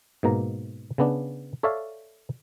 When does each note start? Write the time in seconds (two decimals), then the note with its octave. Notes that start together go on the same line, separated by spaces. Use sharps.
0.23 G#2 B2 A#3 A#5
0.98 C#3 B3 D4
1.63 A4 C#5 D5 E5 F5 A5